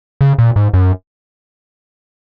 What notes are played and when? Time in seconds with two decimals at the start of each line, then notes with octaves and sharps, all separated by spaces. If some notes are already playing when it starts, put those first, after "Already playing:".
0.21 C#3
0.38 A#2
0.56 G#2
0.74 F#2